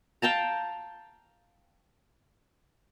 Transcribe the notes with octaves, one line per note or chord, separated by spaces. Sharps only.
F5 G5 A5 A#5